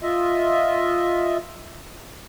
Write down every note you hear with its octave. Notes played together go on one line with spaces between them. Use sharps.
F4 D#5 E5